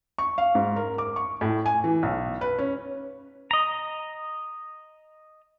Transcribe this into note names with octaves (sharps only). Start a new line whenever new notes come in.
C#6
F5
G#2
A#4
D6
C#6
A2
G#5
E3
B1
B4
C#4
D#5 A#5